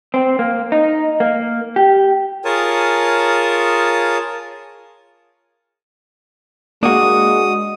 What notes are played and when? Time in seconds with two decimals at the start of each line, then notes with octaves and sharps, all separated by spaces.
0.14 C4
0.39 A#3
0.72 D#4
1.20 A#3
1.76 G4
2.45 F4 G#4 A#4 C#5 A5 D#6
6.83 G#3 A#3 D4 F#4 D#6